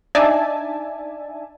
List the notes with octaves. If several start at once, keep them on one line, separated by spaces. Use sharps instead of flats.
D4 D#4 D5 E5 G#5 A5